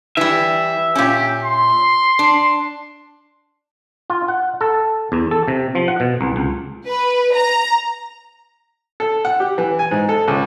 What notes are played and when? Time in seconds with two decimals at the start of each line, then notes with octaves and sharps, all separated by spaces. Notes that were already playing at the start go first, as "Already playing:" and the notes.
0.17 E3 G3 E5
0.95 A#2 C#4 G4
1.44 C6
2.19 D4
4.10 F4
4.28 F#5
4.61 A4
5.12 E2
5.31 A4
5.48 C3
5.75 F3
5.88 F#5
6.00 B2
6.21 C2
6.36 C#2
6.86 B4
7.35 A#5
9.00 A4
9.25 F#5
9.40 G4
9.58 E3
9.79 G#5
9.91 G#2
10.09 A4
10.28 C#2